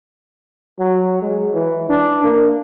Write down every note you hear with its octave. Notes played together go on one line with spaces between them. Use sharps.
F#3
G#3
E3
D4
A#3